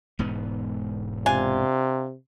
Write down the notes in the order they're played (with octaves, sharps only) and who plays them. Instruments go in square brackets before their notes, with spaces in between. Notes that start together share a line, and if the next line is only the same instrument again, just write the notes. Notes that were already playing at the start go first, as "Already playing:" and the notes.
[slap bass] E1 G#2 B3
[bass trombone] C3 [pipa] D4 F4 G#5